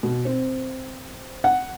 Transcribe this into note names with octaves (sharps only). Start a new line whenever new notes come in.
B2
C4
F#5